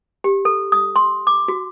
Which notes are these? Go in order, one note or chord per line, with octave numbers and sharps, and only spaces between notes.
G4
A4
D#6
C6
D6
F#4